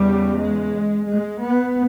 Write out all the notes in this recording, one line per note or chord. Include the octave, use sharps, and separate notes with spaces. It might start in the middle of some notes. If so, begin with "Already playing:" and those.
Already playing: E2 C#3 G3
G#3
G#3
B3